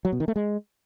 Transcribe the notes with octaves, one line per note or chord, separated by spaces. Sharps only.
F#3
B2
D#3
A3
G#3